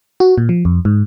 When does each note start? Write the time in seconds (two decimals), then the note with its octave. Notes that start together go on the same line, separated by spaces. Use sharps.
0.20 F#4
0.38 A#2
0.49 F3
0.65 F2
0.85 G#2